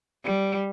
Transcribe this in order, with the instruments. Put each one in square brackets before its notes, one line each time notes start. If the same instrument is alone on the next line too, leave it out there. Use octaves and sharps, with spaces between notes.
[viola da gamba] G3